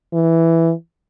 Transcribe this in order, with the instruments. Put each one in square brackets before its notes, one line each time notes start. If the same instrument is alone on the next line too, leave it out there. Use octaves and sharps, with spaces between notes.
[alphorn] E3